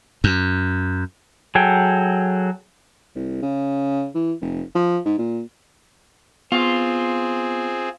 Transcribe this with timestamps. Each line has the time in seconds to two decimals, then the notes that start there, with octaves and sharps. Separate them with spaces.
0.24 F#2
1.55 F#3 G#4 A4 G5
3.15 C2
3.42 C#3
4.14 E3
4.41 F1
4.75 F3
5.05 G#2
5.18 A#2
6.52 B3 C4 F4 G#4